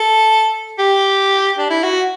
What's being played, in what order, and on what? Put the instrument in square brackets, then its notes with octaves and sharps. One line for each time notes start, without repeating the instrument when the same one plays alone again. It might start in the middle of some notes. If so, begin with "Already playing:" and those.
Already playing: [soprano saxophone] A4
G4
D4
E4
F#4